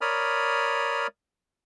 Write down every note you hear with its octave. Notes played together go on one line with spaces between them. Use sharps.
A#4 C#5 D5 B5 D#6 F6